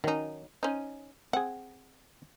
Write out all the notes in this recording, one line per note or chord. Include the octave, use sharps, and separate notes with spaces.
D#3 F#3 C#4 D#4
C#4 D#4 C5
C4 G#4 F#5